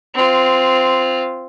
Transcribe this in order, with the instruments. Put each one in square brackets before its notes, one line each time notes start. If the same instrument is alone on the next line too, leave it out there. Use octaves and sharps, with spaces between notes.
[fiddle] C4 F4